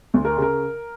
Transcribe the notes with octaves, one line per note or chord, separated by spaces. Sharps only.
D2
A#4
C#3
A#4